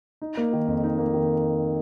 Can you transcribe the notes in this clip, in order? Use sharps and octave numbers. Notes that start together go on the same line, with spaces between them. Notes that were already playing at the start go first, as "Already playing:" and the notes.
D#4
A#3
D#3
F2
D#4
A#3
D#3